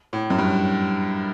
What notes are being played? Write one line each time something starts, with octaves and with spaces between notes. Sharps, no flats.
A2
F#2
G2